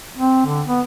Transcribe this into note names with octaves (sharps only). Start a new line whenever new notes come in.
C4
D3
B3